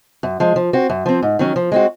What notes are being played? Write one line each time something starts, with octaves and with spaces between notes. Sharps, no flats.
F#2
F3 G#3
F3
C4 F#4
F#2
F3 C4
G#2
D#3 F#3 C#4
F3
G#3 C4 F#4